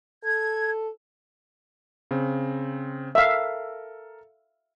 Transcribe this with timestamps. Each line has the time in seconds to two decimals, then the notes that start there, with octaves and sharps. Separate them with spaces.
0.24 A4 G#6
2.11 C#3 C4
3.15 A4 A#4 E5 F5